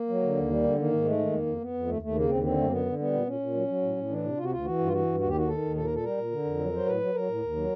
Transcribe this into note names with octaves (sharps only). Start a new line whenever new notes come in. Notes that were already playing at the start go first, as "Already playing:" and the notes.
Already playing: A#3
F#3
D3
D#2
G3
D3
D#3 A#3
G#2
G#3 A3
D#3
F2 A#3
F2
F2 B3
F2
D#2 A3
D#2 A3
C#3 A#3
D#2 C4
D3 C4
F#2 A3
A#3
D3 B3
D3
G3 B3
A#2
A#2 C#4
A#2
F#3
F#3
A2
A2
E3 D4
C3
C3 F4
F#4
D2 F4
E3 F#4
G2
F4
E3 F#4
G2
D#2 F#4
G4
D#3 F#4
D#3 A4
D#2
A#2 A4
A#4
A#2
A4
G3 A#4
A#2
D3
F2
F#3
F#3 C5
A2 B4
F#3
F#3 A#4
A2
D#2
F#3